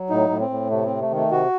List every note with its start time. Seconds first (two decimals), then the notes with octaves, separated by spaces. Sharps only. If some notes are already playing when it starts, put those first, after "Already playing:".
Already playing: F#3
0.10 A2 D#4
0.30 A2
0.41 C4
0.50 A2
0.70 C3 A3
0.86 C3 C4
1.01 A3
1.10 D#3
1.16 A3
1.31 C3 F#4